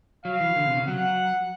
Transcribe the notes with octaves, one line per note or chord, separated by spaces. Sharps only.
F#3 F5
E3
D3
C3
C#3
F#3 F#5